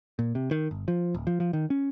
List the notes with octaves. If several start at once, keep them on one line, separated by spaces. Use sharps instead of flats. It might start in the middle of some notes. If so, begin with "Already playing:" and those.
A#2
C3
D#3
G1
F3
D1
F3
F3
D#3
C#4